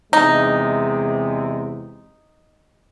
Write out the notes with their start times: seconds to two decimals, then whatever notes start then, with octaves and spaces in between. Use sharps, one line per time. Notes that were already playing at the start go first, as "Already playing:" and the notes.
0.13 E2 C3 G#3 D#4